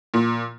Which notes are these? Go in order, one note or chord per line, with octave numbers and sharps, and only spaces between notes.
A#2